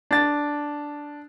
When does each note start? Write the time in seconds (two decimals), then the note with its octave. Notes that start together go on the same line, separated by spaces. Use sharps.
0.11 D4 A6